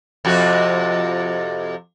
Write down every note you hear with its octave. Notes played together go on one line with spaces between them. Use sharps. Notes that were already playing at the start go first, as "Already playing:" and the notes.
F2 C3 F#4